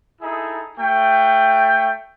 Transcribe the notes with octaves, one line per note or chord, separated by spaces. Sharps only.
D#4 E4 G#4 A4
A3 F#4 G5